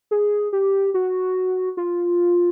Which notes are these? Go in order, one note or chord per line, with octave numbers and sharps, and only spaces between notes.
G#4
G4
F#4
F4